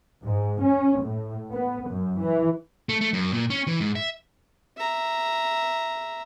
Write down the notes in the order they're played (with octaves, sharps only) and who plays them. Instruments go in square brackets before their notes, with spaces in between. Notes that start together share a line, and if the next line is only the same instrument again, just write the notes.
[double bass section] G#2
C#4
A2
B3
F#2
E3
[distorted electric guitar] A3
A3
F#2
A#2
C#4
E3
G#2
E5
[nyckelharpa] E5 A#5